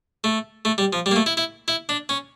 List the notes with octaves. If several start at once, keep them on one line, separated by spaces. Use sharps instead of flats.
A3
A3
G3
F3
G3
A#3
A3
E4
E4
E4
D4
C#4